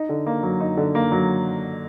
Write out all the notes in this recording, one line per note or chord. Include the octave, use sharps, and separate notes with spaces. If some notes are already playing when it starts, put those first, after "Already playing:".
Already playing: D#4
D3
A#3
F#3
D#4
D3
A#3
F#3